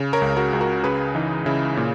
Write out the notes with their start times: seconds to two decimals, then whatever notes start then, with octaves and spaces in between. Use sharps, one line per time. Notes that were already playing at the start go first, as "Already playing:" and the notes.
Already playing: C#3
0.13 A#4 C#5
0.22 C#2
0.37 F#4 A#4
0.53 C#2
0.61 F#4 A#4
0.83 C#3 G#4 B4
1.15 E3 D#4
1.46 C#3 E4
1.77 A#2